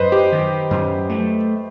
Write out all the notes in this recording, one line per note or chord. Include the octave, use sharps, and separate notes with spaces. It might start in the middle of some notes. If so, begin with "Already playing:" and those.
Already playing: F#2 B4 C5 D#5
G4
D#3
F#2
A3